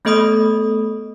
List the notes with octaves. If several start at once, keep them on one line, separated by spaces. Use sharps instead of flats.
A3 B3 A4 D#5 B5 D#6